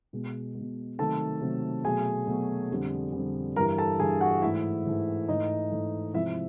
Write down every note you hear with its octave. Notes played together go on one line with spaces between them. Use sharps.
B2 G#3
G#3
B2
C3 D#3 F#3 A3 A4 A5
C3 D#3 F#3 A3
B2 F#3 A3 G#4 G#5
B2 F#3 A3
F2 D3 G3
F2 D3 G3
G2 E3 G3 A#4 A#5
A4 A5
G2 E3 G3 G#4 G#5
F#4 F#5
G#2 E3 A3 E4 E5
G#2 E3 A3
G#2 E3 A3 D#4 D#5
G#2 E3 A3
C3 F3 G#3 E4 E5